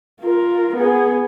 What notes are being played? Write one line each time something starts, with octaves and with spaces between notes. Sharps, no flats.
F4 A#4
B3 G#4